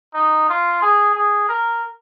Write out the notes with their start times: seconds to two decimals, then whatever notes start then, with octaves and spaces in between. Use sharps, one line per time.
0.14 D#4
0.49 F4
0.82 G#4
1.15 G#4
1.48 A#4